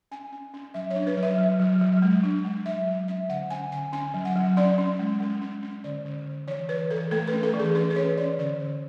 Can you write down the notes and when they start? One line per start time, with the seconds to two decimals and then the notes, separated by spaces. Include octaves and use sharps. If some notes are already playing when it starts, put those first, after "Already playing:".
0.11 C#4 G#5
0.32 C#4
0.54 C#4
0.74 F#3 E5
0.90 C#5
0.96 D4
1.07 B4
1.17 F#3
1.23 E5
1.38 F#3
1.59 F#3
1.81 F#3
2.02 G#3
2.23 D4
2.45 G#3
2.66 F#3 E5
2.87 F#3
3.08 C#4 E5
3.29 D3 F#5
3.50 C#4 G#5
3.71 D3 G#5
3.93 C#4 G#5
4.14 F#3
4.25 F#5
4.35 F#3
4.57 C#4 D5
4.78 C#4
4.99 G#3
5.20 G#3
5.42 C#4
5.63 C#4
5.84 D3 D5
6.06 D3
6.26 D3
6.47 E3 C#5
6.69 E3 B4
6.91 E3 A4
7.11 A3 A4
7.28 B4
7.33 C#4
7.43 A4
7.54 E3
7.59 G#4
7.75 C#4 B4
7.90 B4
7.96 C#4 C#5
8.17 C#4 D5
8.39 D3 D5
8.60 D3